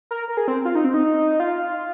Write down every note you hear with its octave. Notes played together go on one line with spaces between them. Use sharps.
A#4
A#4
G#4
C4
F4
D#4
C4
D#4
F4